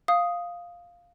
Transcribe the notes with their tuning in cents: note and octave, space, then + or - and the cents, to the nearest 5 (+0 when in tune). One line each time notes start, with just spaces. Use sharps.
F5 +0 D#6 +0